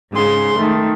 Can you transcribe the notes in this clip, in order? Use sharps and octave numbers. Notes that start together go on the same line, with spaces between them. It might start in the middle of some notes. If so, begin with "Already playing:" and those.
G#2 C#3 C6
D#3 A3